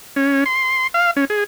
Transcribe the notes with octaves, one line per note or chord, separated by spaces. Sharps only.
C#4
C6
F5
C#4
G#4